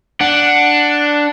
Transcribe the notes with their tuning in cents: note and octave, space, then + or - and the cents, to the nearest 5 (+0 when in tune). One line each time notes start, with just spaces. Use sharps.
D4 +0 F#5 +0